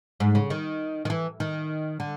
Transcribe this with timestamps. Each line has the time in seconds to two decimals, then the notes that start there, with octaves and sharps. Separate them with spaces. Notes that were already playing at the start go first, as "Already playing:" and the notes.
0.20 G#2
0.35 C#3
0.50 D#3
1.05 D#3
1.10 E3
1.40 D#3
2.00 D3